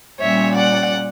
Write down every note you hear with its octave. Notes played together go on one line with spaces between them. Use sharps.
A#2 G3 C#4 C#5 E5
D5 F#5